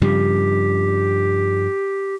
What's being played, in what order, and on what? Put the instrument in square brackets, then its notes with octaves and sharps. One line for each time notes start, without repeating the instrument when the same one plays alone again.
[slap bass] G2 C#3 F3 [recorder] G4